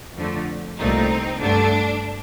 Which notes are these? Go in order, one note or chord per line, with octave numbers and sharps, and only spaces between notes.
F2 D3 A3
C2 A#2 A3 C4 D#4
G2 D3 A3 D4